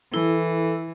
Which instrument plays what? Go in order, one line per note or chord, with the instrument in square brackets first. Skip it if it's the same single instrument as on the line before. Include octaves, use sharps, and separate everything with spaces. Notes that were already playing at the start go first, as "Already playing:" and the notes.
[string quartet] E3 [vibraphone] E4 [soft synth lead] A4